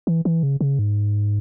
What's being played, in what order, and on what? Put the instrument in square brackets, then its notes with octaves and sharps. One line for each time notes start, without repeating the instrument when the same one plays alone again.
[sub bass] E3
E3
C#3
C#3
G#2